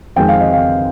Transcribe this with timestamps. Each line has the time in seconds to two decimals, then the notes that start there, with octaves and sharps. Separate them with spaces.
0.16 F2 D#3 G#3 C4 G5
0.28 F5
0.41 D#5
0.53 F5